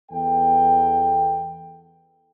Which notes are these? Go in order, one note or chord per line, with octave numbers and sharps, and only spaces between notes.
E2 B3 A4 G5